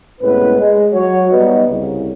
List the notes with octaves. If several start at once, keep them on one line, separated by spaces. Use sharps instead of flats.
C2 A2 G#3 B3 C#4 B4
G#3
F#3 F#4 C#5
G3 B3 D#4
C2 C#3